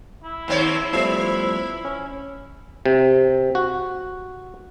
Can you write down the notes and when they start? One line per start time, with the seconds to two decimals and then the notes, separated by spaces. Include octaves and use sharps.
0.23 E4
0.48 D#2 C4 C#5
0.93 F3 G3 A3 B3
1.85 C#4
2.86 C3
3.55 F#4